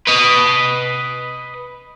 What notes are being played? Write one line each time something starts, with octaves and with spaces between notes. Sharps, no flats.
B4 D#5